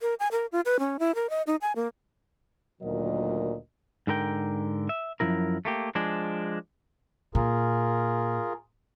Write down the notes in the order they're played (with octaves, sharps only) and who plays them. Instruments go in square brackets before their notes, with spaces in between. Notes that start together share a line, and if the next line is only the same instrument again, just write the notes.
[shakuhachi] A#4
G#5
A#4
F4
B4
C#4
E4
A#4
D#5
D#4
G#5
A#3
[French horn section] D2 A#2 D#3 F#3 A#4 D#5
[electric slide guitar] G#2 D3 A#4 G5
E5
F#2 D#3 F3 E4 A#4
A3 A#3 G4
F3 G#3 D4
[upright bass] A#2 [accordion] F4 G#4 A#4